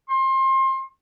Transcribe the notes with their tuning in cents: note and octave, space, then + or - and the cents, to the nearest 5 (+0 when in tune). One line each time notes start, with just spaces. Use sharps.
C6 +30